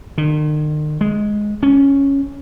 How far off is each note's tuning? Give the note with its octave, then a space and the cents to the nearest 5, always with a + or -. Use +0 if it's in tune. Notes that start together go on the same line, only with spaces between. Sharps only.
D#3 -45
G#3 +5
C#4 +0